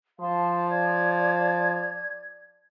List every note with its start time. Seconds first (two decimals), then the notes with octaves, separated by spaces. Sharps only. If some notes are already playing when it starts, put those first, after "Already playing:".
0.20 F3 F5 A5 C6
0.70 D5 G#6